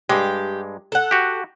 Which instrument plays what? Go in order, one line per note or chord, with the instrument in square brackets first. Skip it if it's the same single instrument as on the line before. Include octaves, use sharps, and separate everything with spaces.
[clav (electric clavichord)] G2 G#3 [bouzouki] G4
[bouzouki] A4 F#5
[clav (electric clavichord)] F#4 G4